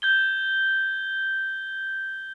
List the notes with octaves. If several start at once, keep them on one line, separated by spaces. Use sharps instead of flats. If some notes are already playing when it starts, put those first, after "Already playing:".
G6 G#6 G7